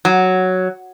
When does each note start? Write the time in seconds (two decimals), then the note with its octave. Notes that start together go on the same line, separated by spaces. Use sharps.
0.05 F#3